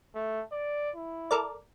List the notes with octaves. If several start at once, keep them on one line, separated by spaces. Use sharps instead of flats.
A3
D5
E4
A4 A#4 D5